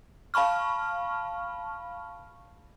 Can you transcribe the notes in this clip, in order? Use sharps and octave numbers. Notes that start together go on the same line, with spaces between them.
F5 A5 B5 C#6 F6